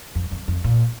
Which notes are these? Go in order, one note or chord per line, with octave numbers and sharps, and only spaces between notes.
F2
F2
F2
A#2